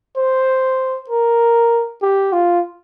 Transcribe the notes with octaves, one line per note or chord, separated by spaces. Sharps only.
C5
A#4
G4
F4